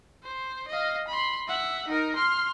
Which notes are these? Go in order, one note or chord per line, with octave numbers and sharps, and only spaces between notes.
C5
D#5 F5
B5 C6
E5 F#5
D#4 A#4
C6 F6